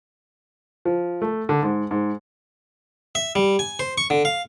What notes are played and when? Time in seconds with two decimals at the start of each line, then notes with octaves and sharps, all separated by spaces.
0.85 F3
1.22 A3
1.49 D3
1.63 G#2
1.91 G#2
3.15 E5
3.35 G3
3.59 G#5
3.79 C5
3.98 C#6
4.10 D3
4.25 F5